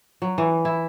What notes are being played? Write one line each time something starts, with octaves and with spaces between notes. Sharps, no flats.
F#3
E3
E4